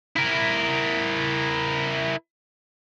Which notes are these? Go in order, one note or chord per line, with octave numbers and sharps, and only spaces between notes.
E4 A#4